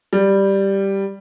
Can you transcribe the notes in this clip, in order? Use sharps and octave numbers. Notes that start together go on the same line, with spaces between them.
G3